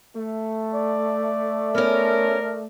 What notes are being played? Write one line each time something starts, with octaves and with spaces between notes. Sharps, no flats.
A3
D5
B3 C#4 A#4